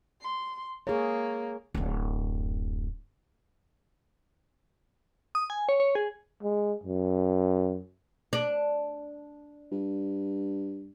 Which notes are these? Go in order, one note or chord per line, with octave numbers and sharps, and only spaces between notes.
C6
A#3 G#4 C#5
D1 F#2
D#6
G#5
C#5
C#5
G#4
G#3
F#2
D4
G2